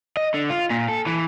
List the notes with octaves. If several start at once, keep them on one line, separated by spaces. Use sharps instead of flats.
D#5
D3
F4
A#2
A4
E3